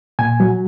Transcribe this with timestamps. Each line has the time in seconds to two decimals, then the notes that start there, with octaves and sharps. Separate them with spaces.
0.19 A#2 G#5
0.40 F#3